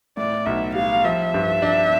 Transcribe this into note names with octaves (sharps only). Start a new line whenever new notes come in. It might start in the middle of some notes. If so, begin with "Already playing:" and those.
A2 D5
B1 E5
G3 F5
F3 E5
G2
D4